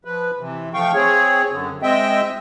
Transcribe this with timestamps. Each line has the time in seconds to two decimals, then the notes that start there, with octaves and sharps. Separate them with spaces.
0.05 F3 B4
0.39 C3 E3
0.74 F3 A3 F5 G5 C#6
0.94 C4 G#4 C#5
1.51 F#2 D3
1.82 G#3 C4 D#5 E5 G5